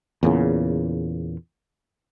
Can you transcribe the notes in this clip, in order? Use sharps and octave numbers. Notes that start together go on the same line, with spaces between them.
E2 A#2 C#3